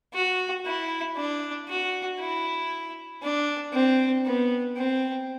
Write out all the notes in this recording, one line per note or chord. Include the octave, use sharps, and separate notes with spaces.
F#4
E4
D4
F#4
E4
D4
C4
B3
C4